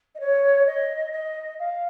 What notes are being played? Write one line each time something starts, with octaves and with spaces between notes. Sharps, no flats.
D#5
C#5
D#5
D#5
F5